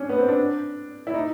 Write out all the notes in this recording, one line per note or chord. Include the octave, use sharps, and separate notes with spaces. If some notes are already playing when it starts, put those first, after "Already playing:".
Already playing: C#4 D4
B3
C4
D4
E4
D#4